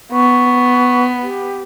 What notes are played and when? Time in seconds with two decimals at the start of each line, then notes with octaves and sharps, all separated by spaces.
0.12 B3 C#6
1.22 G4